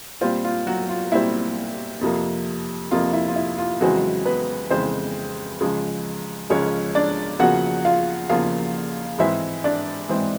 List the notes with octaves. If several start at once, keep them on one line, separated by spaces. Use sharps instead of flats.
A#2 G3 C4 F4
F4
F#3 F#4
F4
A#2 G3 C4 E4
F2 C3 F3 A#3
F2 C3 F3 A#3 F4
E4
F4
E4
F4
F2 C#3 E3 F#3 G#3 C4 F#4
B3 B4
F2 C#3 E3 G#3 C4 C5
C#2 C#3 F3 G#3
C#2 C#3 F3 G#3 C#4 C#5
D4 D5
E2 C#3 F3 A#3 F#4 F#5
F4 F5
E2 C#3 F3 A#3 F4 F5
G#2 E3 G#3 C4 E4 E5
D4 D5
G#2 E3 G#3 C4